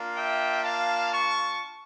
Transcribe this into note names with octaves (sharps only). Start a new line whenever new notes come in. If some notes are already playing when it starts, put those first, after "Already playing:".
Already playing: A#3 D4 F4
E5 G5
F5 A5
A5 C#6